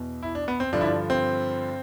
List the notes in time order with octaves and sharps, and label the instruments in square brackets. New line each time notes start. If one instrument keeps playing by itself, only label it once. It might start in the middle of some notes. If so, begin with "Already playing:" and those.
Already playing: [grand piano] E2 B2
E4
D4
B3
C4
G2 D3 F3 D4
E4
D4
C4